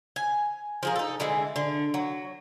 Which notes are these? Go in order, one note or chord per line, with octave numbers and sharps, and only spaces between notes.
G#5
F3 G#4 A#4
D#4 A4
D3 E3 G#3
D3
F#3